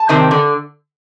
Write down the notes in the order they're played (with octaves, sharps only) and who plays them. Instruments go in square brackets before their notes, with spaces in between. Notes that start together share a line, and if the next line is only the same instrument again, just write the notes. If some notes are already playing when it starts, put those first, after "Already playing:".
Already playing: [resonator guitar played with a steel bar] A5
C3 D#3 G3 C4
D3